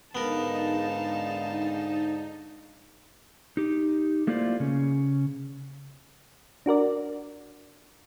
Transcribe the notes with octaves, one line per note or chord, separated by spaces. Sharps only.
G#2 D3 B3 D#4 A#4 F5 A5
D#4 G4
A3 A#3 E4 F4 C5 D5
C#3 C#4
D4 F#4 A#4 D5